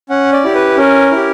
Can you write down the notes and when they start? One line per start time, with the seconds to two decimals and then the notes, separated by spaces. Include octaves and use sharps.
0.10 C#4 F#5
0.33 D5
0.44 E4 G4
0.55 B4
0.77 C#4 A#4
1.11 E4 G4